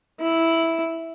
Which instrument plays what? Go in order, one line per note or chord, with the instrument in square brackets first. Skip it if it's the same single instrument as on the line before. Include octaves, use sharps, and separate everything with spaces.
[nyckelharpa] E4